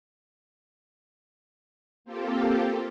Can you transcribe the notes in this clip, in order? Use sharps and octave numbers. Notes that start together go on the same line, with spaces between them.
A#3 C4 F4 G4 A4